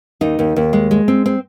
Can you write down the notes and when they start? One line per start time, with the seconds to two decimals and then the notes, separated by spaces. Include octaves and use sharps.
0.21 D#2 D#4
0.39 D#2
0.56 D#2
0.73 G#3
0.91 G#3
1.08 C4
1.26 C4